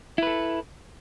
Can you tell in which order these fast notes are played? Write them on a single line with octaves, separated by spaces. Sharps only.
E4 B4 A4